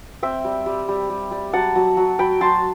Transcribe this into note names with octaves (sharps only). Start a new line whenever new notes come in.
C4 E5 G5
G3
G3
G3
G3
G3
F#3 F#5 A5
F#3
F#3
F#3 G5 B5
F#3 A5 C6